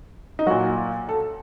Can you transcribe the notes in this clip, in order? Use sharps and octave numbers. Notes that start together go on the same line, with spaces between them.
D#4
A#2 F#3 F#4
A4